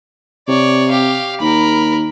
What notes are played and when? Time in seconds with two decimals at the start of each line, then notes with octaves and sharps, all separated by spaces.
0.48 C3 C#5 D5
0.89 G4 F5
1.41 D#2 A#4 B5